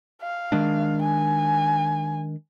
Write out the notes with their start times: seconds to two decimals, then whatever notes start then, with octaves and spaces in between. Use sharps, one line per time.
0.22 F5
0.52 D#3 G#3 D4
1.02 G#5